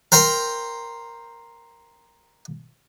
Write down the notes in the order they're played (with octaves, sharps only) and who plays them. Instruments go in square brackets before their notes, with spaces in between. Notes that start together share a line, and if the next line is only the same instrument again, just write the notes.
[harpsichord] A#4 C5 G5 A#5 C6